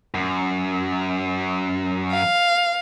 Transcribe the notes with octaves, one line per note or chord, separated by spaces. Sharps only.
F#2
F5